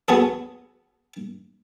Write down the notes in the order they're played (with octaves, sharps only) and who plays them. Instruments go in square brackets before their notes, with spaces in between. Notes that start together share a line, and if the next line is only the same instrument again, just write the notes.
[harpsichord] B3 F#4 G#4 A4